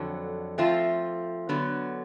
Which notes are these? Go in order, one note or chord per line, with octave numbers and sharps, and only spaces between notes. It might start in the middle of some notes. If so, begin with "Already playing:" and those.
Already playing: F2 D3 F#3
F3 A3 C4 F4
D3 F#3 B3